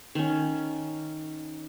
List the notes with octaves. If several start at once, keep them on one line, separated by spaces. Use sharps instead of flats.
D#3 C#4